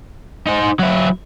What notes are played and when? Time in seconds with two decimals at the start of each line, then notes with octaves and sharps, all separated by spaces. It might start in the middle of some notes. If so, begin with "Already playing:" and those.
0.47 D#4 C5
0.79 F#3 E4